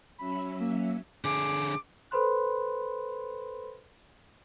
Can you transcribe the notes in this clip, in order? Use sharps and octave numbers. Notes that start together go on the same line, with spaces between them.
F#3 C#4 E5 B5
A#3
D3 G#4 D6
A4 B4 C5 B5 C6 F#6